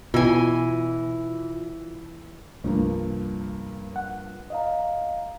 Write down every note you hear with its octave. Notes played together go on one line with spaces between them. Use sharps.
B2 E3 F4 G#5
C2 G2 F3 A#3
F#5
D#5 F5 A#5